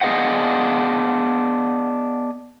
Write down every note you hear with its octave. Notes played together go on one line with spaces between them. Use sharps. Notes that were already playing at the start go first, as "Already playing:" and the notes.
B3 D4 G#4 D#5 F5 F#5